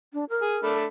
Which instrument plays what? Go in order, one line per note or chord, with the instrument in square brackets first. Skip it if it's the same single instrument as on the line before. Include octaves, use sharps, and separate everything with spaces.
[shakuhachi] D4
A#4
[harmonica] G#4
A3 D4 B5